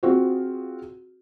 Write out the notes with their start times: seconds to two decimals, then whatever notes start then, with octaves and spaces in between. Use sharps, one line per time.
0.03 C4 F4 F#4 G#4 C5